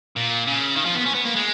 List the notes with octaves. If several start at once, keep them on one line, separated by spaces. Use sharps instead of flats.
A#2
C#3
D#3
F3
B3
C#4
B3
A#3
G#3